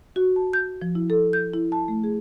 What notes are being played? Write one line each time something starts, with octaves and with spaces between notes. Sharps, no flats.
F#4
A5
G6
F3
E4
A4
G6
E4
A5
A3
G#4